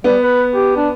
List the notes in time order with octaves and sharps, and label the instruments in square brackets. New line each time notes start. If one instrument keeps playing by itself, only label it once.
[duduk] G3 [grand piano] B3
[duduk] B4
G4
D4